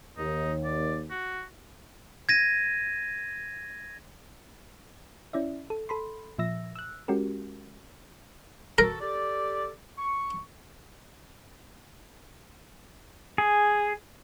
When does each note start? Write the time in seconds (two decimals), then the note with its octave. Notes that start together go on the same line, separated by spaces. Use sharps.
0.18 D#2 D#4
0.64 D5
1.10 F#4
2.29 G#6 A#6 D#7
5.33 C#4 E4 D5 E5
5.70 A4
5.89 A4 B5 C6
6.39 A#2 F3 E5 E6 A#6
6.76 E6 F#6
7.08 G#3 C#4 F#4 G4 A#4
8.78 E3 F#4 A4 A#4
9.00 G4 A4 D5
9.98 C#6
13.38 G#4